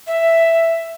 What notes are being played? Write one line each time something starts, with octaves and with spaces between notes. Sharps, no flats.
E5